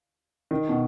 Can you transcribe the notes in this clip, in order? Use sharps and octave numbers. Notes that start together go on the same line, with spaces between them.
D#3
B2